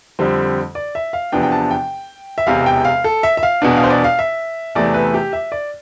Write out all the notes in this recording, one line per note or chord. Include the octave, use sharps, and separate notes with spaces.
F2 D3 G3 C4
D5
E5
F5
E2 C3 F3 B3 D4 G5
G5
A5
G5
E5
E1 E2 C3 F5
G5
F5
A4
E5
E5
F5
E2 B2 B3 D4
F5
C5
D5
F5
E5
E2 C3 E3 A3 D5
B4
G4
E5
D5